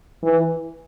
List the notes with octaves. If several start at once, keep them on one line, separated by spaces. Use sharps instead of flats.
E3